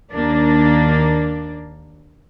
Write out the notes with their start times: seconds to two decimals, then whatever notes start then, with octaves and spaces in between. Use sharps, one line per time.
0.12 D#2 A#3 D4